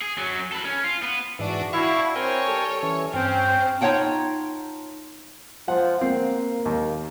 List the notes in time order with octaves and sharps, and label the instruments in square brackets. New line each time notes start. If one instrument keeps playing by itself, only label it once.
[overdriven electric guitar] G#4
F#3 C#4
A4 B4
C#4
F4
B3
[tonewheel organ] G#2 E3 [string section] D4 F#4
[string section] D4 F#4 [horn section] E4 [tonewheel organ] E5 F5 C#6
[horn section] C4 [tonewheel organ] A#4 G5 G#5 [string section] C#5
[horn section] G3 A4
[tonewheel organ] E3 C#4
[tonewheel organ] G2 [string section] C4 C#4 [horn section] C5 F5 G5
[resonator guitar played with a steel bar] D#4 F4 C#5 F#5 G5 A5
[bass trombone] F3 [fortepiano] F#5
[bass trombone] A#3 [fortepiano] C4
[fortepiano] D#2